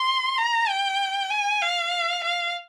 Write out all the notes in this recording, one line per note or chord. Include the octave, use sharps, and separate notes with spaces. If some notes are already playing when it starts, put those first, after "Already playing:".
Already playing: C6
A#5
G5
G#5
F5
F5